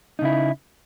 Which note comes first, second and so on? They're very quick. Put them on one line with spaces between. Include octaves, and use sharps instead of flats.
D#4 C#3 E4